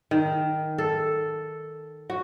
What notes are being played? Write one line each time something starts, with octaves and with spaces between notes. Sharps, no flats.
D#3
A4
F#4